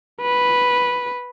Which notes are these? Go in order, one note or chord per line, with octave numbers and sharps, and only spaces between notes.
B4